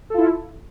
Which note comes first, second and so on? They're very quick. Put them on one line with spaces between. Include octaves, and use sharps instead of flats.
A4 F4 E4